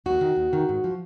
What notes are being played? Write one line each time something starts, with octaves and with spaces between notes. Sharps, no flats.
D#2 F#4
D#3
D#2
D#3
G#2
F3